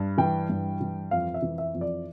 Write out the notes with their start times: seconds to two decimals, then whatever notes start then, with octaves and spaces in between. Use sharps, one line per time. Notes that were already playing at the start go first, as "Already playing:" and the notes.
Already playing: G2
0.18 E3 G5
0.49 G2
0.81 E3
1.11 F2 F5
1.34 E5
1.42 E3
1.58 E5
1.74 F2
1.81 D5